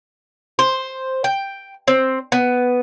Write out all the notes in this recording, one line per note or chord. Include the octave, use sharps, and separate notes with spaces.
C5
G5
C4
B3